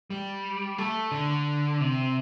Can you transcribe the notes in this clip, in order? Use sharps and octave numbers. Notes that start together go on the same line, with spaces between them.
G3
A3
D3
C3